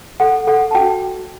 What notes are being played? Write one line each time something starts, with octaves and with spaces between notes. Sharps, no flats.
A4 F#5
A4 F#5
A5
F#4 G5